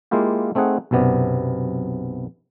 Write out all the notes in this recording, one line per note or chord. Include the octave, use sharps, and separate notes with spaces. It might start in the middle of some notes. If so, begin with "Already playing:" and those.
G#3 A#3 E4 F4 G4
A3 C4 D#4 G#4 F#5
B1 F#2 C3 B3 D5